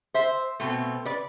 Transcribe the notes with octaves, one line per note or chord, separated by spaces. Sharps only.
C5 E5
B2 A3 C4
B4 D5